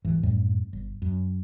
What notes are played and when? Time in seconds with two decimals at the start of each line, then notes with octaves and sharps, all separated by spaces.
0.04 G#1 G2 E3
0.23 F#2 A2 G3 A3
0.73 G1
1.02 F#2